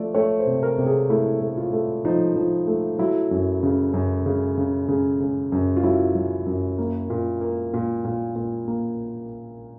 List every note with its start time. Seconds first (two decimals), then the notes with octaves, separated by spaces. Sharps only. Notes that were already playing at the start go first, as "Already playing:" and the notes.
Already playing: F3 A3 D5
0.15 A3 C#5
0.39 C5
0.47 C3
0.63 A#4
0.78 C3
0.86 G#4
1.10 A3 E4
1.41 A3
1.57 F4
1.73 A3
2.05 F3 D#4
2.36 F3
2.67 A3
2.99 F#3 E4
3.31 F#2
3.63 C#3
3.94 F#2
4.26 C#3
4.58 C#3
4.88 C#3
5.20 C#3
5.52 F#2
5.77 F4
5.83 F#3 E4
6.15 F#3
6.46 F#2
6.79 A#3
7.10 A#2
7.41 A#3
7.74 A#2
8.05 A#2
8.36 A#2
8.68 A#3